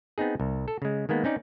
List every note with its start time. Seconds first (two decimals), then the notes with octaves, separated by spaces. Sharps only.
0.18 B3 C4 D#4 G#4
0.40 C2
0.68 A4
0.82 C#3 G#3
1.09 D#3 G#3 A#3 B3
1.24 C4 C#4 D#4 D5